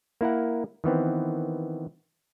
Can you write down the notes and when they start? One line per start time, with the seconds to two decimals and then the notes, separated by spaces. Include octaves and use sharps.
0.21 A#3 E4 A#4 F#5
0.84 D#3 E3 B3 C4